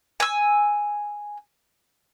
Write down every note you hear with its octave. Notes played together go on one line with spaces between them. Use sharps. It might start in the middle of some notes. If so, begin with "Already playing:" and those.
G#5 E6